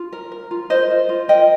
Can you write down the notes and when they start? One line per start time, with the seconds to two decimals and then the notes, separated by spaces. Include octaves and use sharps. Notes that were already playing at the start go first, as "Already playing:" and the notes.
Already playing: F4
0.12 A#4
0.32 A#4
0.51 F4
0.70 A#4 C5 D#5
0.90 F4
1.09 F4
1.28 A#4 D#5 G5